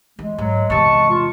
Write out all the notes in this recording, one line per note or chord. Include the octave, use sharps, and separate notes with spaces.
E2 G#3
G#2 F#3
E2 C3 A5 C#6
F4